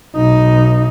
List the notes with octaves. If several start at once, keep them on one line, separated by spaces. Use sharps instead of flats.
B1 D#4